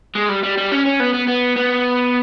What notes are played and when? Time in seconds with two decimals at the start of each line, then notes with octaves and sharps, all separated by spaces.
0.15 G#3
0.29 G3
0.43 G3
0.57 G3
0.71 C#4
0.85 C#4
1.00 B3
1.14 B3
1.27 B3
1.56 B3